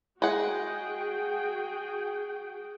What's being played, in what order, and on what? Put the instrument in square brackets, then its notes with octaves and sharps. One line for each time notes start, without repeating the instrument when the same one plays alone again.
[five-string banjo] G#3 F#5 [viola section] F#4 G#4 G5